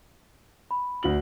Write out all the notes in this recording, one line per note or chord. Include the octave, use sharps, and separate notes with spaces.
B5
D2 F#4 F#7